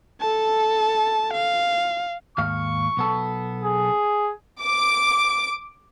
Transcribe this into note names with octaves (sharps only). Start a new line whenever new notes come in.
A4 A5
F5
D#2 G#2 F5 C#6
B1 B3 A4
G#4
D6